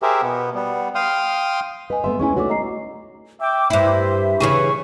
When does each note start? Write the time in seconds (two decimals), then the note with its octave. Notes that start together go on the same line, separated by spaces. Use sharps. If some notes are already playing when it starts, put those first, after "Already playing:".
0.02 G4 G#4 A#4 C5 E5
0.22 B2 B3
0.55 G3 B3
0.95 F5 G5 C6 D#6 F6
1.90 B4 D#5 G#5
2.04 A3 B3 E5 C6
2.19 G#3 C#4 E4 G#5 C#6
2.36 A3 D#4 F#4 C#5 D5 D6
2.49 D#5 A#5 C7
3.40 E5 G5 D6
3.70 G2 E4 C5 E5
4.40 C#3 E3 G#4 C#6